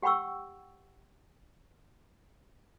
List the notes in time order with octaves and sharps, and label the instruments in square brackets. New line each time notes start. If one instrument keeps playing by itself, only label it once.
[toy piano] G4 F#5 G5 B5 C#6 E6